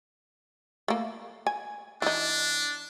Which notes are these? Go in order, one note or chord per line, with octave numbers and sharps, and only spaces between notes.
A3 A#3
G#5
E3 D4 D#4